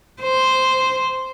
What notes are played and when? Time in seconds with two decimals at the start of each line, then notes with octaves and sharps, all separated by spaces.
0.22 C5